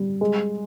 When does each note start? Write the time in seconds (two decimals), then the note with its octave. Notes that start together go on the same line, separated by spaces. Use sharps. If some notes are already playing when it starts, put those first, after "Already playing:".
Already playing: G3
0.21 G#3